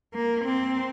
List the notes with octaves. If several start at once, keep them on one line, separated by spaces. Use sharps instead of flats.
A#3
C4